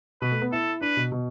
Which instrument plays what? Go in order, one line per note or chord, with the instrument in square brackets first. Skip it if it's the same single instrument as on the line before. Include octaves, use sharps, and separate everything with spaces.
[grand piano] B2 [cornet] B4
[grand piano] A3
B3
[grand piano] E4 [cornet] A4
[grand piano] D4 [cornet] B4
[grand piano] B2
B2